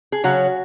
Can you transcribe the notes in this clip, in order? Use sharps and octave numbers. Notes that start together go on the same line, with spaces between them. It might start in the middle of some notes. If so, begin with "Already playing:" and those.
G#4
C#3 F#3 C#4 F#4